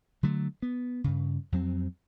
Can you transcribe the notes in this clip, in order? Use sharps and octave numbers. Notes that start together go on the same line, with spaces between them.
D3 F#3 A3
B3
G2 C#3
F2 F#3 B3 C4